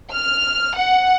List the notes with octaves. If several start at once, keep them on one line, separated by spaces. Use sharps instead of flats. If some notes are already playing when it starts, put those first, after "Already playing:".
F6
F#5